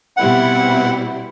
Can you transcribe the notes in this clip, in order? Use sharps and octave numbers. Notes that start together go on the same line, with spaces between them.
B2 G3 C4 E4 F#5